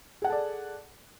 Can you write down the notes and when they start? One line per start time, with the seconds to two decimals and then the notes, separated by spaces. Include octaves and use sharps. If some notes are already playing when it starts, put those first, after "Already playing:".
0.22 G#4
0.24 F#5
0.27 A4
0.30 A5
0.32 D5